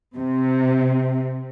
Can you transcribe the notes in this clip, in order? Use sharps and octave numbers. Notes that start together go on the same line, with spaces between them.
C3